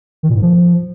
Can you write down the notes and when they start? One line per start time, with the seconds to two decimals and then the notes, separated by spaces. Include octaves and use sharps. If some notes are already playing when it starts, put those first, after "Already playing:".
0.23 D#3
0.29 A#2
0.35 G#2
0.42 F3